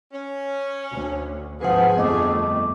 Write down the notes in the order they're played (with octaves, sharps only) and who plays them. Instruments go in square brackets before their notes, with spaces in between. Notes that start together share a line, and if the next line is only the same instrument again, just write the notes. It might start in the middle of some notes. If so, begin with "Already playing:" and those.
[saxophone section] C#4
[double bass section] D2
[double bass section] G#1 F3 [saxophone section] G#4 [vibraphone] B4 F#5
[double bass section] G1 F2 A3 [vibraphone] B3 D#5 D6